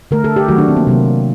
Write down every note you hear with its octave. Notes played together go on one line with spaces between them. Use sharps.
D3 A3 A#4
A4
G4
D#3 F#3 A3 F#4
D4
C4
A#3
C3 F#3 A#3